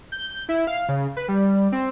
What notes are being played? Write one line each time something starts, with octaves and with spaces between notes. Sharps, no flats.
G6
E4
F5
C#3
B4
G3
C4